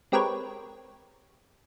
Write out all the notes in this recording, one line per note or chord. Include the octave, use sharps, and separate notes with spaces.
G#3 C4 G4 A#4 B4 C#5